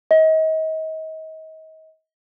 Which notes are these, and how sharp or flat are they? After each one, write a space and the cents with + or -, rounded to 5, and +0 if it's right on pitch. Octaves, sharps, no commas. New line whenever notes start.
D#5 +35